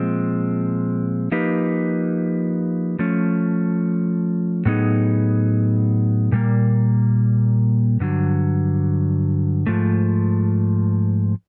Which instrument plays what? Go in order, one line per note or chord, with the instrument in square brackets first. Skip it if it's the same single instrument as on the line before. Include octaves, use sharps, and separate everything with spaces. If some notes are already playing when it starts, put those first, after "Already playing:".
Already playing: [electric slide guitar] A#2 F3 G#3 C4
F3 A#3 D#4 G4 B4
F3 A3 C#4
A2 F#3 B3 D#4 G#4
A#2 G3 A#3
G2 D3 F#3
G#2 F3 A3